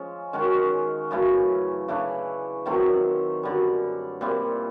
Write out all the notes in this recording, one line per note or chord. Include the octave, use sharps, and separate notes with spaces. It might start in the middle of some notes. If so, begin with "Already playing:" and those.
Already playing: F3 G#3 C#4
D#3 G#3 C#4 F#4
F#2 C#3 E3 A3
C#3 E3 A3 D4
D#3 F#3 A3 C4
F#2 D3 G3
A#2 G3 C4 E4